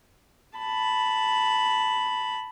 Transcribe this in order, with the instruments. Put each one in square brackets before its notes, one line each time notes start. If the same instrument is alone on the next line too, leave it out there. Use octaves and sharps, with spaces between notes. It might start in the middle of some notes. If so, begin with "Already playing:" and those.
[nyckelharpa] A5 B5